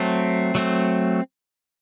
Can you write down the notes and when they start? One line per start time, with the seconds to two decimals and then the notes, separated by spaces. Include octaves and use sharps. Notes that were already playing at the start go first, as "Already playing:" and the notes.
Already playing: F#3 A3 C4
0.55 F#3 A3 C4